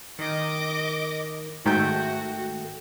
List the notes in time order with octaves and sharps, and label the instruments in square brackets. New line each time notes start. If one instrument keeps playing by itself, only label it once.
[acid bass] D#3 [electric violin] D#5 D6
[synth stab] G#2 D#3 [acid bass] A3 [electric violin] F#4 [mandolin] G5 G6